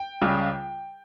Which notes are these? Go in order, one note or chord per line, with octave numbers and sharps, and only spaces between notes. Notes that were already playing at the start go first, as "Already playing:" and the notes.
Already playing: G5
C#2 C#3 G3